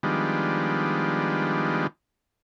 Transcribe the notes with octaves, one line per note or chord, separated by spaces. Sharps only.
D#3 F3 G3 G#3 B3 D4